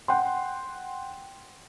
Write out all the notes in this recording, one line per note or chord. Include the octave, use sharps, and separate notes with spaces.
F#5 G5 C6